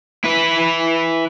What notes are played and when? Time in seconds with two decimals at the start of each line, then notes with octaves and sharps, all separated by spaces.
0.24 E4 B4